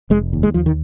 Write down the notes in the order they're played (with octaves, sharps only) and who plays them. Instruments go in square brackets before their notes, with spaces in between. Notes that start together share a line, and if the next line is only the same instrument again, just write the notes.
[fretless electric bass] F1 G#3
D#2
G#3
D#2 F3
D#3